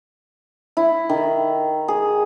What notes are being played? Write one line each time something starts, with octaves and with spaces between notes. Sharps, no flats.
E4
D#3
G#4